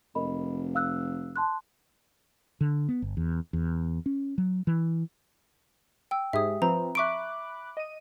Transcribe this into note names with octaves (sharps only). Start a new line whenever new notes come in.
F1 A#4 D#5 B5
F5 E6 F#6
A5 C6 F#6
D3
B3
G1
E2
E2
C#4
F#3
E3
G5 E6
G#2 G4 G#4 E5 D#6
F3 C4 B4 A#5
E5 B5 C#6 D6 F#6 D7
D#5 D#7